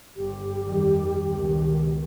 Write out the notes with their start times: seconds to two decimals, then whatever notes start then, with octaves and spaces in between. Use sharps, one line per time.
0.17 G1 G4
0.66 F2 D#3 G3
1.26 C#2 B2 D#3